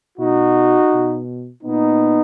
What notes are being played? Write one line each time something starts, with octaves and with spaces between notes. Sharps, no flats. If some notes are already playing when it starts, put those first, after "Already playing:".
B2 D#4 F#4
B2
A#2 B3 D#4